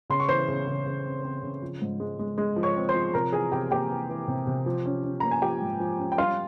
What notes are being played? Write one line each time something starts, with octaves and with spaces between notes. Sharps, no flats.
C#3 C6
C#6
E3 C5 C6
C#3
C#3
C#3
C4
C4
C#3
F3
G#2
G#3
G#3
G#3
F3
C#5 C#6
C4
C5 C6
F3
C3 A#4 A#5
E3 G#4 G#5
C3 G4 G5
A#3 G4 G5
E3
E3
C3
C3
F3
C#4
C#4
A#3 A#5
G#5
F3 G4 G5
G#2
F3
C#4
G5
G3 F4 F5